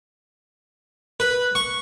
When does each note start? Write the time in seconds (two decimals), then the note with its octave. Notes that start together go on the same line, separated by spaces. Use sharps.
1.20 B4
1.55 C#6